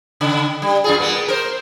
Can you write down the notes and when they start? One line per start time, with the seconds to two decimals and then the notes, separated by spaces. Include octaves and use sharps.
0.21 C#3
0.62 G3
0.84 F#2 F4 G#4
1.00 A#3 B3
1.28 A#4 C5